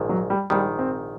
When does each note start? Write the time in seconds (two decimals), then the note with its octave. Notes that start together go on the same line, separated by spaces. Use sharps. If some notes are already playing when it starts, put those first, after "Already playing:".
Already playing: A#1 G#2 D#3
0.09 F#3
0.30 G3
0.50 A#1 G#2 D#3 G3
0.79 C4